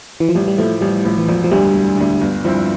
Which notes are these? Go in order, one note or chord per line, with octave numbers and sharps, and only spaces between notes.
E3
F3
A1 G3
G3
A2 F3 A3
A1 G3
A2 F3
E3
E1 F3
F3
D2 D3 G3
E1
D2 D3
G1
G2 F3 C4 E4